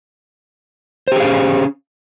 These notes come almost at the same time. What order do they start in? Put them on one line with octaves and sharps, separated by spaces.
C5 G4 G#4 F5 C#4